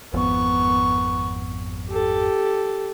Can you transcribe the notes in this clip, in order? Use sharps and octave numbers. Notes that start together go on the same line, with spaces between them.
G#1 F2 B3 C#6
G4 A4